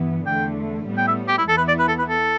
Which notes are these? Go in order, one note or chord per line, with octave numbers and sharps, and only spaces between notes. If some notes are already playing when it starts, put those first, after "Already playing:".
Already playing: G2 E3 B3
E2 D3 A3 G5
A2 G3 B3
G5
E5
G4
E4
E2 E3 B3 E4 A4
B4
D5
B4
A4
B4
A4